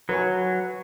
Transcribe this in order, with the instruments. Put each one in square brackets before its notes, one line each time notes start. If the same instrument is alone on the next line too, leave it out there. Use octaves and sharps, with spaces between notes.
[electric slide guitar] F#3 [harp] B4 C#5 G#5